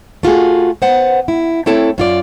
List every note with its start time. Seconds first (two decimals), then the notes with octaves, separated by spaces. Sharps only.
0.23 A3 F4 F#4 G#4
0.82 B3 C5 F#5
1.28 E4
1.66 A3 C4 E4 A4 C#5 G5
1.98 F#2 F4 D5